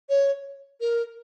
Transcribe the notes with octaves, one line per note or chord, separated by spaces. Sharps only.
C#5
A#4